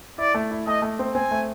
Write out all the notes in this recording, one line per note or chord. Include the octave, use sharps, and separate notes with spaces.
E4 D5
A3
E4
A3 D#5
A3
C4
C4 G#5
A3